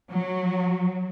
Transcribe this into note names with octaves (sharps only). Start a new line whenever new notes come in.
F#3